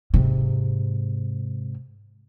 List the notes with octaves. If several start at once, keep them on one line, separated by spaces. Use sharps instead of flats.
G#2 C3